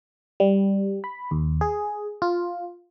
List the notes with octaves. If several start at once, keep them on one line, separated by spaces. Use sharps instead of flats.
G3
B5
D#2
G#4
F4